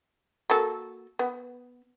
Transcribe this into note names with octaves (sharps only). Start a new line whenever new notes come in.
A#3 F#4 A4
B3